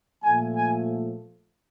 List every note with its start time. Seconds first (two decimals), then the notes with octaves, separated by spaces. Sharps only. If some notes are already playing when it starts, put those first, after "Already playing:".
0.23 A#2 F3 A3 G#5
0.55 G#5